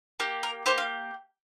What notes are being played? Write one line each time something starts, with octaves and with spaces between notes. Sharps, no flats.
A#3 G4
A#4
A#3 G4 C5
F5